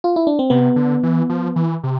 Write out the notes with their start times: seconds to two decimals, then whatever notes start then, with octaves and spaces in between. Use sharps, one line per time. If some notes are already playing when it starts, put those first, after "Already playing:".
0.04 F4
0.16 E4
0.27 D4
0.39 C4
0.50 C3 B3
0.76 D3
1.03 E3
1.30 F3
1.56 E3
1.84 C3